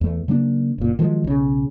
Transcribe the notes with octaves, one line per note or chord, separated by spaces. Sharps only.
E2 A3
C#3 F#3 A#3 D4
F#1 A#2
D#3 F3 F#3 G#3
B1 C#3